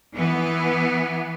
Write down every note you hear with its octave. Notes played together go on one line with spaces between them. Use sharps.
E3 B3